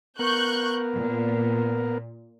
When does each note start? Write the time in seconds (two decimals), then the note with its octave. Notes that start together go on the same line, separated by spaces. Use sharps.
0.19 B3 A#4 C#6 F#6 G6
0.95 A#2